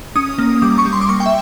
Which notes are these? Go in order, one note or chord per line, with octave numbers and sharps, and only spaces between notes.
C#4 D#6
A#3
G3 D6
C#6
G3
C6
D6
A#3 C#6
G5
E5